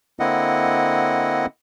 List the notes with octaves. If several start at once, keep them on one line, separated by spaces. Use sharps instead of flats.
D3 A#3 C4 E4 D#5 F#5